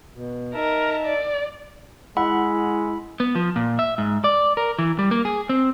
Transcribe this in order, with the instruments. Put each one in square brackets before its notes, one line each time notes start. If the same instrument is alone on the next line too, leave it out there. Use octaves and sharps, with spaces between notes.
[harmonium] B2
[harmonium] D#4 E5 A5 [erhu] A#4
[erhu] D5
[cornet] G#3 [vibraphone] E4 [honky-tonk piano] F#5 [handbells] B5
[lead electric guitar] B3
F3
A#2
E5
G#2
D5
A#4
E3
G3
A#3
G#4
C4